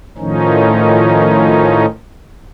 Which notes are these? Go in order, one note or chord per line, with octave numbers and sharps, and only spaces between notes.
A2 D#3 F3 C#4 D#4